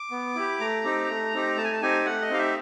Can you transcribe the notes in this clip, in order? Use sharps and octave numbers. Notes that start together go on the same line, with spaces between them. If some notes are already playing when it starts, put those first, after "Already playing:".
Already playing: D6
B3
E4 G4
A3 A#5
C4 D#4 G4
A3
C4 D#4 G4
A3 A5
G#5
A5
C4 D#4 G4 G#5
A3 F#5
D#5
C4 D#4 G4 F5
E5